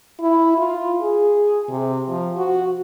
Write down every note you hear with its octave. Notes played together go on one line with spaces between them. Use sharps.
E4
F4
G#4
C3
F3
F#4